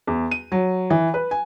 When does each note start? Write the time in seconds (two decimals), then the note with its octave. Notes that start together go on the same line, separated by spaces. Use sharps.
0.07 E2
0.31 D#7
0.52 F#3
0.90 E3
1.14 B4
1.31 G#5